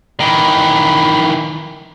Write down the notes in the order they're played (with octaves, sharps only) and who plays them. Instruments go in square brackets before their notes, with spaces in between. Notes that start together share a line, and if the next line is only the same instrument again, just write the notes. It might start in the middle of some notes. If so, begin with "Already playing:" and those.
[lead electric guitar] D#3 E3